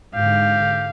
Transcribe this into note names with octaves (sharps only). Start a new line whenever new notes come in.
G#2 D3 G4 F5